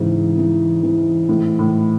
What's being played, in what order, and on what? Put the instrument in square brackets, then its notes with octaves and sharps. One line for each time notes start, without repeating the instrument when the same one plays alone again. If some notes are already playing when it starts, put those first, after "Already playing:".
Already playing: [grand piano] G#2 E3 [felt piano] C#3
[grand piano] E3
E3
[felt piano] A2 [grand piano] E3
[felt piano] A2